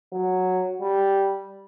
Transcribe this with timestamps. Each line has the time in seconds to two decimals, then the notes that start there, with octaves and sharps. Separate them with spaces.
0.13 F#3
0.81 G3